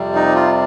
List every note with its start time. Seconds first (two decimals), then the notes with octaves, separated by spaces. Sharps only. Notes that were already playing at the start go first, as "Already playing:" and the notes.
Already playing: F2 C3 G3
0.15 D#4
0.35 F4